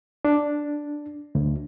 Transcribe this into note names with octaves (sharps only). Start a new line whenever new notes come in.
D4
D2